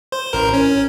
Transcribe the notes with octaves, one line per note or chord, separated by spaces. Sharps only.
C5
A1 A#4
C#4